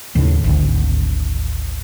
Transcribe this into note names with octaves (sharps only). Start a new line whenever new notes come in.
D#2 A2 C#3
G#1 D2